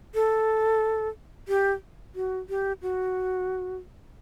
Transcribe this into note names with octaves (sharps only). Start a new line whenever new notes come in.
A4
G4
F#4
G4
F#4